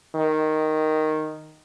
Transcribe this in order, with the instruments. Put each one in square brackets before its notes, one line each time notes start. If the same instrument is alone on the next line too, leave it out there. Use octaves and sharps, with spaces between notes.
[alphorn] D#3